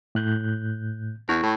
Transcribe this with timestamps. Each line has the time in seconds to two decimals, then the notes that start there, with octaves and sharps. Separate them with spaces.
0.15 A2 F#6 G6
1.29 E2 E4 C#6
1.43 A2